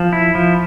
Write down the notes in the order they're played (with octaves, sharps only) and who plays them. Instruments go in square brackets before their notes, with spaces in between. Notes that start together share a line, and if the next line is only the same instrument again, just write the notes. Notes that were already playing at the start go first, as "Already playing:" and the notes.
Already playing: [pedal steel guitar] F3
E4
F3